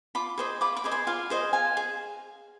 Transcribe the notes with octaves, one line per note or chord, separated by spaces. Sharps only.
F4 B5 D6
G#4 C5 D#5
F4 B5 D6
B5 D6
G#4 C5 D#5
G#5 C6
F4 F5 G#5
G#4 C5 D#5
F4 F5 G#5
G#4